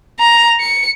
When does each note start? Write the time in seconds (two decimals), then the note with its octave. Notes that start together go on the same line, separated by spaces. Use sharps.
0.19 A#5
0.60 C#7